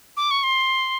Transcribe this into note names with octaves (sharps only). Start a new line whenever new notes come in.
D6
C#6
C6